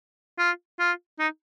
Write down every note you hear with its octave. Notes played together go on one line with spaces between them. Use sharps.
F4
F4
D#4